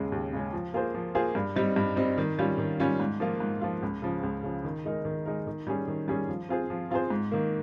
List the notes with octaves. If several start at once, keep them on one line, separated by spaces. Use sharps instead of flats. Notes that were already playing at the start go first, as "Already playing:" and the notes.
Already playing: D#2 C#3 G#3 C#4
D#2
C#3 G#3 C#4
F3
A#3 F4 G#4 C5
F3
A#3 F4 G#4 C5
G2
G3 C4 D#4
G2
G3 C4 D#4
D#3
G3 C#4 F4
D#3
G3 C#4 F4
G#2
F3 A#3 F4
G#2
F3 A#3 F4
C#2
C#3 F3
C#2
C#3 F3
D#3
G#3 D#4 A#4
D#3
G#3 D#4 A#4
D#3
G3 C#4 G#4
D#3
G3 C#4 G#4
F3
C4 F4 G#4 C5
F3
C4 F4 G#4 C5
G#2
D#3 A#3